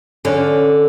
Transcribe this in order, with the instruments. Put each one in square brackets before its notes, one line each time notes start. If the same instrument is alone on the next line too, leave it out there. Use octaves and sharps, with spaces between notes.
[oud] D3 C#4